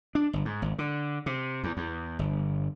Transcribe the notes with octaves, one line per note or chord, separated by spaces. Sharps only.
D4
G1
G#2
G#1
D3
C3
E2
E2
G1